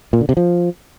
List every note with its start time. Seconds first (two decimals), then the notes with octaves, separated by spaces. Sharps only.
0.13 A#2
0.21 D3
0.29 C3
0.37 F3